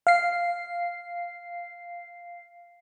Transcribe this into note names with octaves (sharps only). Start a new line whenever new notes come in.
F5 C7